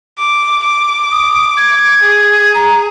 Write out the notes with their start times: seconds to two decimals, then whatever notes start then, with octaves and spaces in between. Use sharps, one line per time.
0.18 D6
0.63 D6
1.11 D#6
1.57 G#6
2.02 G#4
2.54 A#5